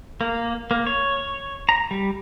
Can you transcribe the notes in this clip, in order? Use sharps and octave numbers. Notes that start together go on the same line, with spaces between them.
A#3
A#3
C#5
A#5
G3